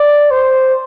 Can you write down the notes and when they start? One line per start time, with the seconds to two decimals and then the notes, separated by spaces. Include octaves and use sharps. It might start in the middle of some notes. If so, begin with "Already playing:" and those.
Already playing: D5
0.31 C5